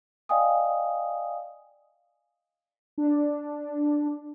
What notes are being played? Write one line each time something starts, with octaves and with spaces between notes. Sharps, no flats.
D5 D#5 F5 G5 G#5 D#6
D4